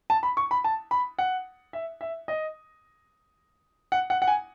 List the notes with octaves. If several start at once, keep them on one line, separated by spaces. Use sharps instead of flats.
A5
B5
C#6
B5
A5
B5
F#5
E5
E5
D#5
F#5
F#5
F#5
G#5